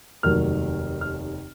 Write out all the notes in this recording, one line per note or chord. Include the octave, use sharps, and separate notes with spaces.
F1 D#2 D#3 F#3 F6
F6